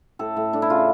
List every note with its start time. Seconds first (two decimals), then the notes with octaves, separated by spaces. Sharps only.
0.19 A2 A4
0.37 A2
0.53 A3 D4
0.62 E4
0.70 C#3 F4